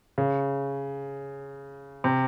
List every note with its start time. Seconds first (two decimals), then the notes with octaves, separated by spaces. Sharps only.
0.18 C#3
2.04 C3